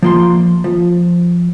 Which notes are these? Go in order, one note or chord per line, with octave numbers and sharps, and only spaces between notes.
F3 A#3 C6
F3